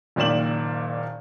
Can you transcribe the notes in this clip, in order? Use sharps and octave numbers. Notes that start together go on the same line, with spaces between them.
F#1 A#2 D#3 D5 E7 F#7